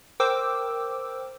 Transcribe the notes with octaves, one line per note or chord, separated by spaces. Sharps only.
A#4 C5 G5 D6 E6